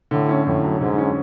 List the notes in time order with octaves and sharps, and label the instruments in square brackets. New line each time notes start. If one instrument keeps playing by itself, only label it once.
[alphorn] A2 [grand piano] D3
[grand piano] C#4
[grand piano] F2 [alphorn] A2
[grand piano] F#3
[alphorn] G#2 [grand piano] D3
[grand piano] C#4